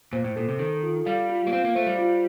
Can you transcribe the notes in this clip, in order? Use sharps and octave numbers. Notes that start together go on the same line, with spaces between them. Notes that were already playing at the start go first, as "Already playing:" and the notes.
A#2 C5
A2
A#2 A4
C3
D#3 A4
F4
G3 F5
F4
A#3
C4 F5
A#3
A3 C5
G3
F4